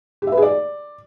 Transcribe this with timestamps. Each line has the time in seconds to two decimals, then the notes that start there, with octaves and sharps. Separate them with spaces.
0.22 G4
0.27 E5
0.32 B4
0.37 G#4
0.42 D5